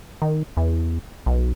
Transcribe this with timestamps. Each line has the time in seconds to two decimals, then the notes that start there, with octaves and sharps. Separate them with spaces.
0.22 D#3
0.57 E2
1.26 B1